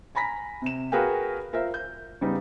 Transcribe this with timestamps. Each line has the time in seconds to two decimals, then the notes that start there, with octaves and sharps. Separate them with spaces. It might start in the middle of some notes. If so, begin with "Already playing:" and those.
0.15 G#5 A#5 B5 A#6 B6
0.62 C3 E7
0.92 F#4 G#4 A#4 B4 F5 G5
1.53 F4 A#4 C5 E5
1.74 G6
2.21 C#3 G3 B3 D#4